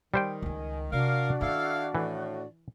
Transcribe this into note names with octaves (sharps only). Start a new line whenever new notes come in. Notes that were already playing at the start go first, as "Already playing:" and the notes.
D#3 G3 C5 G5
C#2 G#3 G#5
C3 D4 F#4 A#4 D5 F5
D#3 C#4 E4 A4 F5
A2 E3